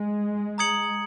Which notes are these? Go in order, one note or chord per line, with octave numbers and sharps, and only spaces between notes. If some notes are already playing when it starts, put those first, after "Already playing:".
Already playing: G#3
A#5 D#6 G#6 C#7 F#7